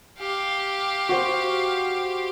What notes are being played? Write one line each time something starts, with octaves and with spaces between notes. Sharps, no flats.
G4 F5
F#4 C5